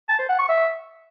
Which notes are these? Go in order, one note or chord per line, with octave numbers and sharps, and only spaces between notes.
A5
C5
F#5
C#6
E5